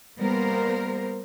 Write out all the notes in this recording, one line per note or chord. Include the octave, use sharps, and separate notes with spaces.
G3 A#3 B3 A#4 C5